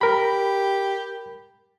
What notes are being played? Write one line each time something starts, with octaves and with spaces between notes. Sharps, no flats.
G4 A#4 B5